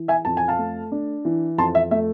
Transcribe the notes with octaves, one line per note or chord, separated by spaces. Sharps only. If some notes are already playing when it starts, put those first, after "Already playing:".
Already playing: E3
E5 G#5
F2 A5
G#5
F5 A5
A3
D4
E3
F2 A5 C6
E5
A3 E5